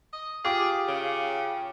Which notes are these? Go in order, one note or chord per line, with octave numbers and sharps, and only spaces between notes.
D#5
F4 G4 G#4 D6
C#3